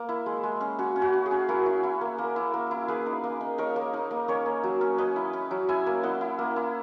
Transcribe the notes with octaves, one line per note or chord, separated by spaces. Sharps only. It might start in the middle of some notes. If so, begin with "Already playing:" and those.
Already playing: A#3 A#4
E4
G#3
G#3
C#4
C#4 F#4
C#4
F#4
C#4
G#4
C#4
E4 F#4 A#4
E4
E4
A#3
A#3
E4
A#3
E4
A#3 G#4 B4
D#4
A#3
D#4
D#4 A#4 C#5
A#3
D#4
A#3
C#4 A#4 C#5
A#3
F#3
C#4
C#4 B4 D#5
E4
C#4
F#3
E4 E5 G#5
A#3
E4 D#5 F#5
E4
A#3
E4